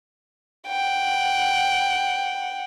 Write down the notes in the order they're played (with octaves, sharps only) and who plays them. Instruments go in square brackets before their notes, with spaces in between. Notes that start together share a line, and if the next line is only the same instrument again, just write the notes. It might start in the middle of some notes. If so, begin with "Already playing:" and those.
[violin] F#5 G5